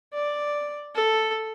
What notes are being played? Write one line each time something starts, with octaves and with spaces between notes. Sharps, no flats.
D5
A4